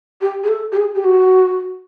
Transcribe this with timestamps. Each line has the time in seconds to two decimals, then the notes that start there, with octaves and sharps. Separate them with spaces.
0.21 G4
0.44 G#4
0.48 A4
0.72 G4
0.77 G#4
0.95 G4
1.04 F#4